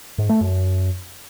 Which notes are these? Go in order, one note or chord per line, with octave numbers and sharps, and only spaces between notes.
G#2
A3
F#2